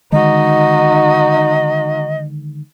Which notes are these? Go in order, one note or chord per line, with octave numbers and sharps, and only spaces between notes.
D3 D#3 G#3 D#4 F#4 D#5